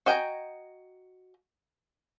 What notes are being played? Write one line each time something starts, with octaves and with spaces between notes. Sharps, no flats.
F#4 D#5 G5 G#5 A#5